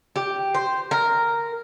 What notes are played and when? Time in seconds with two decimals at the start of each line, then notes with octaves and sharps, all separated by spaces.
0.16 G4
0.55 C5
0.91 A#4